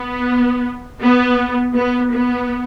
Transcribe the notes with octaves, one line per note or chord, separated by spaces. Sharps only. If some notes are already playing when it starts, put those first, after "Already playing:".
Already playing: B3
B3
B3
B3